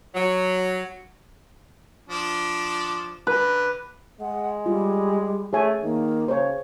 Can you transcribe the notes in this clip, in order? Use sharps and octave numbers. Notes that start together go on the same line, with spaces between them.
F#3
F3 D4
D3 B4
G#3 F#5
G3 F4
A3 G#4 C#5 G#5
D#3 A#3
C#3 C5 C#5